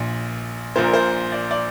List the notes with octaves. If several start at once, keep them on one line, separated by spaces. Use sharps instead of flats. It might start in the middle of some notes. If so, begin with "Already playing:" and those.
Already playing: A#1 A#2
A#1 A#2 C5
A#4
C5
D5
D5